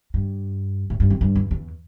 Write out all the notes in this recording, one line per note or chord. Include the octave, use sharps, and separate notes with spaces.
G2
A2
G2
F2
G2
E2
E2